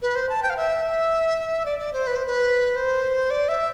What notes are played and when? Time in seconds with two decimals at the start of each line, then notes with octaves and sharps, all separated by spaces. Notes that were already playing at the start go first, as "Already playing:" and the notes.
0.02 B4
0.15 C5
0.29 A5
0.43 G5
0.50 F5
0.57 E5
1.65 D5
1.79 D5
1.93 C5
2.07 B4
2.16 C5
2.26 B4
2.76 C5
3.30 D5
3.48 E5